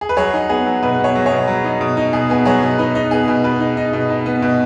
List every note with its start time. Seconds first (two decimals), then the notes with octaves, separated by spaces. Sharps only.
0.01 G#4
0.09 B4
0.17 F#3 G#4 C#5
0.34 D#4
0.49 B3 G#4
0.66 F#3
0.82 B2 B4
0.99 B3
1.04 G#4 C#5
1.15 F#3
1.26 G#4 C#5
1.32 B2
1.48 F#3
1.64 D#4
1.81 B2
1.97 D#4
2.13 B2 G#4
2.30 B3 G#4
2.45 F#3 G#4 C#5
2.63 B2
2.78 D#4 B4
2.95 D#4
3.11 B3 G#4
3.28 B2
3.44 B2 B4
3.60 D#4
3.77 D#4
3.93 B2
4.10 D#4
4.26 B3
4.42 B2